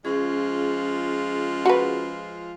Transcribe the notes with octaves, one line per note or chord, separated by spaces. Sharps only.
F3 G#3 C#4 F4 G#4
F#4 B4